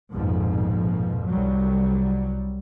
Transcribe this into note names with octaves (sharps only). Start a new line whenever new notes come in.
A#1 F2 G#2 B2 F3
C2 F#3 G3